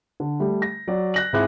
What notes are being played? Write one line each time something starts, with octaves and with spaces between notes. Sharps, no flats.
D3
G3 A3
A#6
F#3 D5
F#6 A#6 F#7
G#2 C4 E4 G#4 D6 F#6